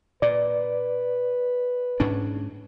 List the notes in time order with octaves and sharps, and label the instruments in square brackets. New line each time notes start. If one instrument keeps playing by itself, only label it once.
[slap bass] A#2 [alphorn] B4 [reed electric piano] D5
[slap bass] G#2 C#4 D4